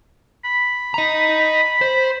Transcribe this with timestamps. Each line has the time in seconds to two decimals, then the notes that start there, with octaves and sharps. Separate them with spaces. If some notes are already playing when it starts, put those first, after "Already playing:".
0.44 B5
0.94 D#5 A#5
1.81 C5